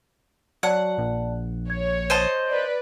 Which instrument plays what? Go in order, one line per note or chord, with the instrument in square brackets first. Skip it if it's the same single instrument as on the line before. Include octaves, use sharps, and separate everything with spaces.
[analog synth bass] F#3 [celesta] D5 A5 [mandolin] F#5
[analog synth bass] A#1
[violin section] C#5 [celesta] G#6
[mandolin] C5 D#5 A5
[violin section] B4 D5